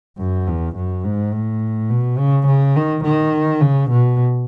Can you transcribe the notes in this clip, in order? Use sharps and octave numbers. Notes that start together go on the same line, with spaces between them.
F#2
E2
F#2
G#2
A2
B2
C#3
C#3
D#3
D#3
C#3
B2